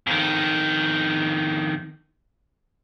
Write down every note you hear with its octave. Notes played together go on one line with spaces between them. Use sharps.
F2 D#3